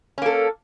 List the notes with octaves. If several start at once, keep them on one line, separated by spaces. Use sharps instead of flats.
A#3 C#4 A4